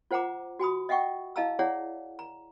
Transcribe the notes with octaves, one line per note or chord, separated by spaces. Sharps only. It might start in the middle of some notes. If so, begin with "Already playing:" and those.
F4 C5 F#5 G#5 A#5 D6
F#4 G#5 B5 D#6
D#5 E5 F#5 G5 C#6
E4 D#5 F5 A5 A#5 E6
E4 G#4 C#5 D5 E5 F#5
A#5